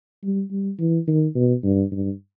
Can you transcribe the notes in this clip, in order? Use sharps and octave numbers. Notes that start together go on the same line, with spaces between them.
G3
G3
E3
D#3
B2
G2
G2